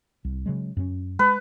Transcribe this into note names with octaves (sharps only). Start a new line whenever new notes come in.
C2
C#3 F#3 G#3
F#2 C#4
G#3 B4